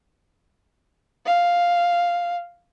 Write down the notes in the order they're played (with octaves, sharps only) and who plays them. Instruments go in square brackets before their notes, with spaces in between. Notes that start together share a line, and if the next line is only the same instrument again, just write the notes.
[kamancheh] F5